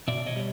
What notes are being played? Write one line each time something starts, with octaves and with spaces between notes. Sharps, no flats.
B2 D5 E5
C#5 D#5
G3